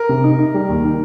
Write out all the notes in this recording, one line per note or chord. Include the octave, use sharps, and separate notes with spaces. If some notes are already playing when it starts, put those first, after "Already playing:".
Already playing: A#4
C3
D#4
D#4
G3
D#2
D#3